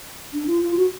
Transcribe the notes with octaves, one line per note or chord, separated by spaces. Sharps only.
D4
F4
F4
F#4